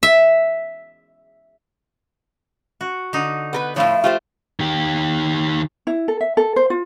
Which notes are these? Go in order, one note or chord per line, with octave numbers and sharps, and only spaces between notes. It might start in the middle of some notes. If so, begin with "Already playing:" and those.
E5
F#4
D3 D#4
B3 A#4 B4
A2 F3 A3 E4 C#5 F5
A3 F4 G4 C5
D#3 G4
E4
A4
E5
A4
C5
F4